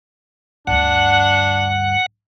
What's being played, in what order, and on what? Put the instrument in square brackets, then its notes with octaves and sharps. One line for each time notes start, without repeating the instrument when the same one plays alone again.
[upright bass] D2 G2 [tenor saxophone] D4 [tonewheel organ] F#5